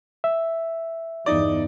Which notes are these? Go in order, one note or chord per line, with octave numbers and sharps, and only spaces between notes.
E5
G1 E2 D#4 D5